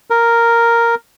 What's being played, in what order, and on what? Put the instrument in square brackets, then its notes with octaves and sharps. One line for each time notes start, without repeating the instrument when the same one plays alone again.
[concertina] A#4